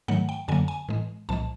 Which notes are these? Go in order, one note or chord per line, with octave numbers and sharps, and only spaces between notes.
G#2 D#3 F#3 A3 F#5
G5
F#2 D3 F#3 A#3 G#5
G#5
A2 E3 G#3
C2 A#2 F3 G#3 A5